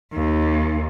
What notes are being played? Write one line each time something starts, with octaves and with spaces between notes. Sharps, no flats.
D#2